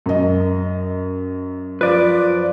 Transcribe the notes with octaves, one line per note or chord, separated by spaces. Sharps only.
F#2 D#5
F3 B4 D5